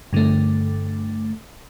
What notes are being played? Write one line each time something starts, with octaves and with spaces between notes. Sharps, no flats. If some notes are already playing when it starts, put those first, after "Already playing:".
G2 D3 A3